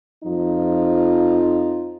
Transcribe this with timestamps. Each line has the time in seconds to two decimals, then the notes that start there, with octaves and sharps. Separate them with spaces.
0.24 F2 F3 D#4 F4